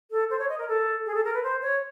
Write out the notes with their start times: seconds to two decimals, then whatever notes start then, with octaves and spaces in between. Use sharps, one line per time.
0.11 A4
0.30 C5
0.39 C#5
0.49 D#5
0.59 A#4
0.68 A4
1.06 G#4
1.15 A4
1.24 A#4
1.34 B4
1.43 C5
1.62 C#5